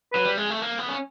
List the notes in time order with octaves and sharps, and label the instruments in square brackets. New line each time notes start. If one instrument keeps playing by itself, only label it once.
[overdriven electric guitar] F#3 [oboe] B4
[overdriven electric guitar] G3
G#3
A3
A#3
B3
C#4